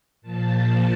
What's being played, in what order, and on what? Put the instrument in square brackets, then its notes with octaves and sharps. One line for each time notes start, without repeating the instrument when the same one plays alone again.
[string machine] A#2 F3 A5